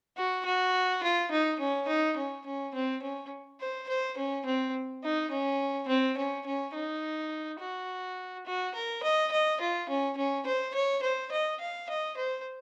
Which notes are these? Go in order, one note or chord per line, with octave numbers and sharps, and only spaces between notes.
F#4
F#4
F4
D#4
C#4
D#4
C#4
C#4
C4
C#4
C5
C5
C#4
C4
D#4
C#4
C4
C#4
C#4
D#4
F#4
F#4
A#4
D#5
D#5
F4
C#4
C#4
C5
C#5
C5
D#5
F5
D#5
C5